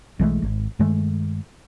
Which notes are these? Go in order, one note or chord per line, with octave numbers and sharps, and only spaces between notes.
B1 E3 G#3 A3
G#1
G2 D#3 G#3 A3